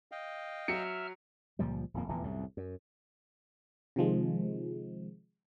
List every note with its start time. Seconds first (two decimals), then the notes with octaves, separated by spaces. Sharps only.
0.12 D#5 F5 G5
0.68 F#3 E5 F6 C#7
1.59 C#2 A#2 F3 G3
1.94 D1 F2 A#3
2.08 F1 E2 A#2 E3
2.23 C2 F#2 A2
2.57 F#2
3.96 C3 D#3 F3 G#3